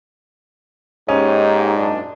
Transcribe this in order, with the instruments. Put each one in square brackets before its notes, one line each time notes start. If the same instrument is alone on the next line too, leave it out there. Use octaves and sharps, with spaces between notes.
[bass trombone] G#2 [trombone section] A#3 D#4 G4 [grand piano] C#4 [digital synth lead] D#5
[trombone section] F#2 A#2 D4